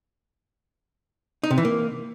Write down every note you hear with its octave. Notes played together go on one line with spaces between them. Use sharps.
D#4
C3
E3
A#3